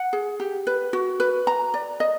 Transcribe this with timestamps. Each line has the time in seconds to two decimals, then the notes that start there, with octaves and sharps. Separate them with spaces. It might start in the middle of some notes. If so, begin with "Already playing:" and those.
Already playing: F#5
0.13 G#4
0.40 G4
0.67 B4
0.93 F#4
1.20 B4
1.47 A#5
1.74 D5
2.00 D#5